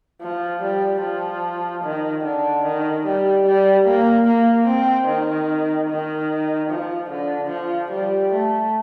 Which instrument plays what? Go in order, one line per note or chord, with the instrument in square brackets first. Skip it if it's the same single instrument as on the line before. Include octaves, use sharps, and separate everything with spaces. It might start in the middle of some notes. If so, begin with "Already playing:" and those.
[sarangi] F3
G3
F3
D#3
D3
D#3
G3
G3
A#3
A#3
C4
D#3
D#3
F3
D3
F3
G3
A3